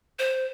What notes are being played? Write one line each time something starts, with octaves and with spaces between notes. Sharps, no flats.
C5